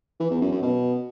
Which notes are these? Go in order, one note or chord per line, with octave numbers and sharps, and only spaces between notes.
E3
E2
F#2
F#2
B2